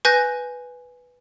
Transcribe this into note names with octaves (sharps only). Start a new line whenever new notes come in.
B4 G#5 F#6 G6 A#6